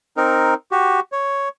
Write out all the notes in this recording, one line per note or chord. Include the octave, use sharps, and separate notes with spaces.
C4 D#4 A#4
F#4 G4
C#5